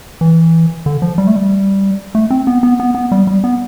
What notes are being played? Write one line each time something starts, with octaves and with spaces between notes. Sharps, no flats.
E3
D3
F3
G3
A3
G3
A3
C4
B3
B3
B3
B3
G3
G3
B3